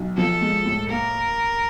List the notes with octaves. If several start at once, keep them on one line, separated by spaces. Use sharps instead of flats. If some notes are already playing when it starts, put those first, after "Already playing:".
Already playing: B1
F3 A4
G#3
A2
A#3 A#4